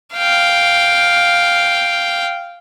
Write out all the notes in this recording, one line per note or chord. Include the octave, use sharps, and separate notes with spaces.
F5 G5